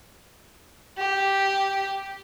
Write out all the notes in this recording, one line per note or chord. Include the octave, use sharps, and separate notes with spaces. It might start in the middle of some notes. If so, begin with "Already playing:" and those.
G4